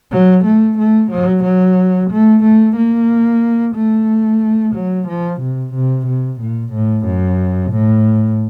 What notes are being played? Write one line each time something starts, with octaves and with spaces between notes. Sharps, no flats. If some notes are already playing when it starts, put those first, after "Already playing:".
F#3
A3
A3
F#3
F#3
A3
A3
A#3
A3
F#3
F3
C3
C3
C3
A#2
A2
F#2
A2